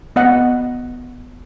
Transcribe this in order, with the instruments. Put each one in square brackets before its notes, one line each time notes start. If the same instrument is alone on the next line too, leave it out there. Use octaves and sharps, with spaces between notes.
[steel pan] B3 D#5 F#5